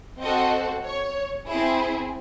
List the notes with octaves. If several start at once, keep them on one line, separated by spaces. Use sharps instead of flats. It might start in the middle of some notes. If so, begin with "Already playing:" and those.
C4 F#4 A4 D#5
C#5
C4 E4 G#4